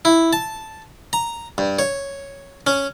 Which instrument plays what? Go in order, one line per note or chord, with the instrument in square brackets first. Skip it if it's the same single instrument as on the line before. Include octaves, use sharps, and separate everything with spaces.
[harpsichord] E4
A5
A#5
G2
C#5
C#4